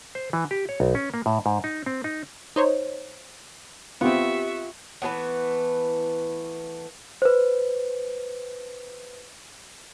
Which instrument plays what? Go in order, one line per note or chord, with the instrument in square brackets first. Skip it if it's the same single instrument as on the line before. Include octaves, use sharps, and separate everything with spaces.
[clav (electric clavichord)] C5
E3
G4
C#5
B1
C#4
A#3
A2
G#2
D#4
C4
D#4
[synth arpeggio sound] D#4 C5 C#5
[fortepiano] B3 C4 [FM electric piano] F4 G4 [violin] E5 C#6
[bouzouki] E3 F#3 A3 B3
[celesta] B4 C5